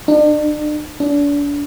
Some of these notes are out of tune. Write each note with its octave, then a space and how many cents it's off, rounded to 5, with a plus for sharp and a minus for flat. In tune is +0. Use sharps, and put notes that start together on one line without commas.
D4 +40
D4 -35